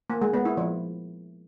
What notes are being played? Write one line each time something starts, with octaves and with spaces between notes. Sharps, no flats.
A#3
G#3
B3
E4
F3